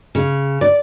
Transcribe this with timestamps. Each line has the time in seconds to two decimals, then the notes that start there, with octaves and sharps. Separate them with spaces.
0.15 C#3
0.61 D5